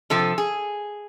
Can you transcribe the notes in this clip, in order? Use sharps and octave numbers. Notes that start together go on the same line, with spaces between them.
C3 F3 A4
G#4